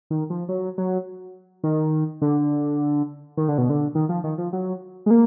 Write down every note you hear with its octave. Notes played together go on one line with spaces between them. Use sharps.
D#3
F3
F#3
F#3
D#3
D3
D#3
D3
B2
D3
D#3
F3
D#3
F3
F#3
G#3
A#3